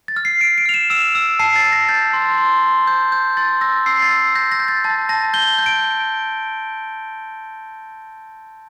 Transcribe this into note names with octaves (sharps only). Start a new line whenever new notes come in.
A6
F6
C7
F6 D7
D7
F6 F7
E7
E6 E7
E6
A5 C7
A6
E6
A#6
G6 A6
C6
C6
C6
G6
G6
C6 A6
E6 A#6
E6 C7
A6
E6
G6 A#6
A#6
G6
A6
A5 A6
A5 A#6
G6 G7
G6
D7